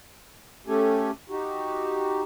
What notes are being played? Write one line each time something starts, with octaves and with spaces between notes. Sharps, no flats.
A3 C#4 G4 A4 G#5
D#4 F#4 G4